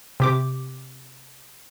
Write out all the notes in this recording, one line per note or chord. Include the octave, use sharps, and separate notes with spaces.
C3 G4 D6